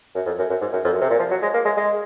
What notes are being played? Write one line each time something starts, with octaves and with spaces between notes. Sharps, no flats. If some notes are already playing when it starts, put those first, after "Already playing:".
F#2
F2
F#2
F#2
G#2
F#2
F2
F#2
C3
A#2
F3
F#3
G#3
A#3
G#3
G#3